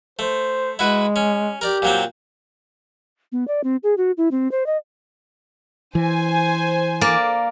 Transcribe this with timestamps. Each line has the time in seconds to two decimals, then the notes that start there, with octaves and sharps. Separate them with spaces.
0.19 A3 C5
0.79 G#3 E4 F#4 B4
1.16 C#4
1.61 G4 A#4 D5
1.82 A#2 F#3 C4
3.32 B3
3.48 D5
3.64 C4
3.83 G#4
3.97 F#4
4.17 E4
4.31 C4
4.51 C5
4.66 D#5
5.95 E3 C5 G#5
7.01 A#3 D5